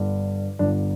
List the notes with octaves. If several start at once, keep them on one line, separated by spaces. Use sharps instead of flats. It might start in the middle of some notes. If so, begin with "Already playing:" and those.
Already playing: G1 G2 D3
G1 G2 D3 D4